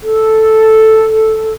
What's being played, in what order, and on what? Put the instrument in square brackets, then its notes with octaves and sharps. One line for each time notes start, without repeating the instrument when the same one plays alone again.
[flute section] A4